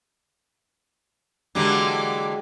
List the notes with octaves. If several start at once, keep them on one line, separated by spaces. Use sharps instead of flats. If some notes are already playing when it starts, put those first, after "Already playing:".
D3 E3 F#3 G#3 A#3 G4 D6